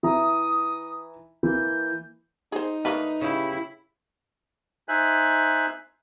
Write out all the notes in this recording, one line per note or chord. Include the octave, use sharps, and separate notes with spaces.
E3 E5 A#5 D#6
E3 A#3 G6
D#4 G#4 C5
D3 A3 A#3 B4
C#3 E4 G4
D#4 C5 E5 G#5 F#6